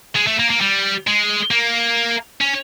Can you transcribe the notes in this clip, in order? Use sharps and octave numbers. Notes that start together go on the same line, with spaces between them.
G#3
A3
A#3
A#3
G3
G#3
A#3
C#4